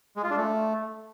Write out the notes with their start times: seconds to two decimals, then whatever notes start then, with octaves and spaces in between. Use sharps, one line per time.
0.17 G#3
0.23 F4
0.30 D4
0.37 A3